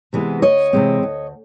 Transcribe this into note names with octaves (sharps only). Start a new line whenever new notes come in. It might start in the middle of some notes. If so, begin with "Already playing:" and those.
C3 E3 G#3 B3
D2 C#5 D#5
C3 E3 G#3 C4
D2